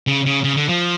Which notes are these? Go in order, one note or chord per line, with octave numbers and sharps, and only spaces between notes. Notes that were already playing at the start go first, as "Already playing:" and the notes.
C#3
C#3
C#3
D3
F3